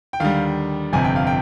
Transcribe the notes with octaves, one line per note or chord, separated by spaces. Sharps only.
G5
D#2 D3 G3 F5
G1 F2 C3 G#5
G5
F5
G5